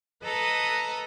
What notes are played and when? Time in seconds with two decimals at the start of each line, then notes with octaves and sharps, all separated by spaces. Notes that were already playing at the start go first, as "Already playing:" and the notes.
0.24 A4 B4 D#5 A#5